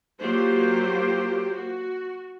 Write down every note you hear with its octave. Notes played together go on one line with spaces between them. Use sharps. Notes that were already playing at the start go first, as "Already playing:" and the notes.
F#3 A#3 F4 G4 C5
F#4